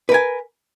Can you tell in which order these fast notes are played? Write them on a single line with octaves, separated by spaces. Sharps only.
B4 A#4 G#5